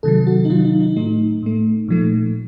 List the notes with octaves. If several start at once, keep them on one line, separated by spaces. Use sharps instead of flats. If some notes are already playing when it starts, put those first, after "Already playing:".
C3 D#3 F#3 A4
F#4
D#4
C3 D#3 F#3 F4
D#4
D#4
A2 A3 D#4
A2 A3
A#2 F3 A3